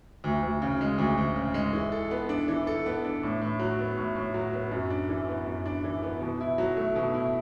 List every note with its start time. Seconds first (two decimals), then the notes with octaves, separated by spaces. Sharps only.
0.24 D2
0.43 D2
0.62 C#3
0.81 G#3
0.98 D2
1.18 D2
1.36 C#3
1.54 G#3
1.73 E3
1.92 A4
2.11 B3
2.29 D4
2.48 E3
2.67 A4
2.86 B3
3.05 D4
3.23 A2
3.41 A2
3.59 F#3
3.79 B3
3.97 A2
4.15 A2
4.34 F#3
4.53 B3
4.71 F#2
4.90 D4
5.09 E3
5.28 B3
5.46 F#2
5.66 D4
5.84 E3
6.03 B3
6.21 B2
6.41 E4
6.58 F#3
6.77 A3
6.95 B2
7.14 E4